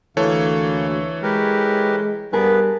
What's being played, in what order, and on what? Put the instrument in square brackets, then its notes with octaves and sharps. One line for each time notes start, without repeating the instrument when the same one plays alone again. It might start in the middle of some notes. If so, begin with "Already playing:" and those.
[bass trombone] D2 [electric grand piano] E3 A4 C#5 [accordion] A#3
[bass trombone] G#3 [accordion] G4 A#4 B4
[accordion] G2 B3 B4 [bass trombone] G3 [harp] G#4 A#4 A5